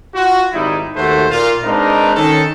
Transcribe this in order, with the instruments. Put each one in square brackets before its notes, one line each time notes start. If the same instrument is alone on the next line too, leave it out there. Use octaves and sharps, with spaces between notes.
[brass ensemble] F4 F#4
G#1 G3 D#4 E4
D#2 A3 F#4 A4 B4 C5
A#2 A#3 F4
G#3 C4 D4 D#4 A#4 B4
D#3 C#4 A4